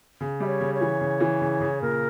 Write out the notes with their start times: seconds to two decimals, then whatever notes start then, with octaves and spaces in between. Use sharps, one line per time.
0.21 C#3
0.40 G3 E5
0.47 C#5
0.60 C#3
0.74 C#5
0.81 E3
1.01 C#3
1.20 E3
1.41 C#3
1.60 C#3
1.82 A#2 A#4